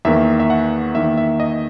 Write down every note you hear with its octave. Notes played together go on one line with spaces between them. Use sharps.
E2 D#3 A#3 E5
E5
F#5
E2 D#3 A#3 E5
E5
D#5